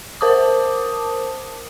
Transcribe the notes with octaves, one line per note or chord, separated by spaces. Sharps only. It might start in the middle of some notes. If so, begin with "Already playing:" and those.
A#4 C5 A5 D6 D#6